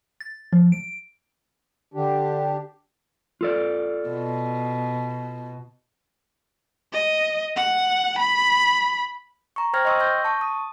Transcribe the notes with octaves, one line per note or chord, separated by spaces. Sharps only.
A6
F3
D7
D3 D4 G4
F4 A4 D5
B2
D#5
F#5
B5
A#5 C#6
C5 G5 F6 G#6 A#6
D#5 G5 C6 C#6 D#6 E6
G6 A#6
A5 C#6
D#6